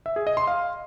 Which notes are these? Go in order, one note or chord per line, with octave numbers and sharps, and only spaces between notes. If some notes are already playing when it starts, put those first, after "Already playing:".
E5
G#4
D#5
C6
F5